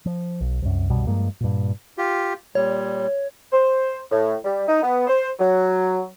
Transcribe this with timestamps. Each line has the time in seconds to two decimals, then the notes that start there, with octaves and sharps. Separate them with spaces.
0.06 F3
0.41 B1
0.62 C2 F#2
0.90 C2 F#2 B2 G3
1.07 G2 F3 G#3 A#3
1.41 G2 A#2
1.98 F4 G4
2.55 A#2 G3 C#5
3.53 C5
4.11 A2
4.45 G3
4.68 D#4
4.82 B3
5.08 C5
5.40 F#3